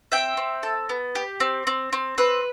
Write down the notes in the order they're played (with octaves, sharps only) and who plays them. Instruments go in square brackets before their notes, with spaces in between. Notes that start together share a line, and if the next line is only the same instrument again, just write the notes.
[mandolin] C4 E5 G5
C4
A4
B3
G4
C4
C4
C4
C4 B4